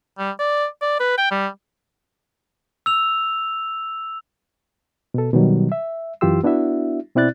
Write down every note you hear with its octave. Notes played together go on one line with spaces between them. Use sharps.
G3
D5
D5
B4
G5
G3
E6 F7
B2 A4
B2 D#3 F#3 G3
E5
F#2 E3 F4 G4 C6 E6
B3 D4 E4 F#4 E5
B2 C4 E4 D5 F#6 A6